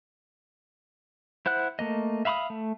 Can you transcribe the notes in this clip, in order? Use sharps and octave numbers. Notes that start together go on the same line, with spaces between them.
E4 C5 F#5 F#6
A3 A#3 D#5
E5 F5 B5 D6 D#6
A3